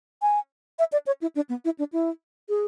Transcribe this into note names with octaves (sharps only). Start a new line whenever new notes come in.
G#5
E5
D5
C#5
E4
D4
B3
E4
D4
E4
G#4